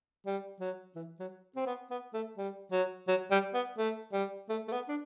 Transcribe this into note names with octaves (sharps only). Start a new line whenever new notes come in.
G3
F#3
E3
F#3
C4
B3
B3
A3
G3
F#3
F#3
G3
B3
A3
G3
A3
A3
B3
D4